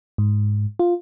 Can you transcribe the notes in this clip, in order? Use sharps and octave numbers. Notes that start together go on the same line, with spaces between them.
G#2
F4